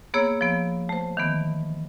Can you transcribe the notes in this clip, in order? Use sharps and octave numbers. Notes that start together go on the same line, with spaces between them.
A#3 B3 G#4 C#5 E6
F3 B3
A3 C5
D#3 E3 B3